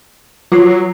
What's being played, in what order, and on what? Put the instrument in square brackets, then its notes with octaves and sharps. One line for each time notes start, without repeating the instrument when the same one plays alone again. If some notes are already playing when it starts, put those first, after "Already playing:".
[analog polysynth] F#3 [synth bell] F4 C7